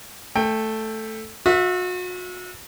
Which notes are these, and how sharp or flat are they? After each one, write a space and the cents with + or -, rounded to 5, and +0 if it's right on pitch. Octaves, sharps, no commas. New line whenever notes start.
A3 +0 G5 +20
F#4 -35 E5 +0